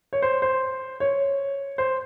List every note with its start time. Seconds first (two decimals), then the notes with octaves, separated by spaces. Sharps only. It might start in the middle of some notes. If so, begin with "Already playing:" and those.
0.13 C#5
0.22 C5
0.42 C5
1.00 C#5
1.78 C5